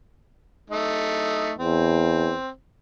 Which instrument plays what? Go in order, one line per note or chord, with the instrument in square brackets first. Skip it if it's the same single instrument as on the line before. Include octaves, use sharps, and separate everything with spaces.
[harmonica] A3 D#4
[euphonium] E2 [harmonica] C4